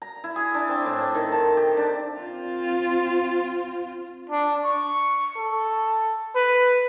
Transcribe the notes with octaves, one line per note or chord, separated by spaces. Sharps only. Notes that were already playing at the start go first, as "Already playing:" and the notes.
A#5
E4
G#4
D4
C4
A2
D#3
A5
G4
D4
C4 F4
D4
C#6
A4
B4